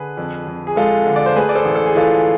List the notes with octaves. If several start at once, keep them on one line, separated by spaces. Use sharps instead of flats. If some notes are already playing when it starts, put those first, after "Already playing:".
Already playing: D3 G#4 B4
F2
F2
G#4
G#3 F4 A4
D3
D5
C5
A3 G#4 B4
D5
A4 C5
A1
A4
G#4
E3 F4 A4